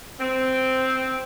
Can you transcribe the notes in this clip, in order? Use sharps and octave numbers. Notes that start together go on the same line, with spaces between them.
C4